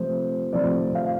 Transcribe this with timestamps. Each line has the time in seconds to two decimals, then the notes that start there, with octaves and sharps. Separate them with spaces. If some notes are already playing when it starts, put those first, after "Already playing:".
Already playing: C3 F3 A3 C5
0.53 C3 F3 A3 D5
0.95 F5